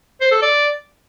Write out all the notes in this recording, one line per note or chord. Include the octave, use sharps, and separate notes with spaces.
C5
A4
D5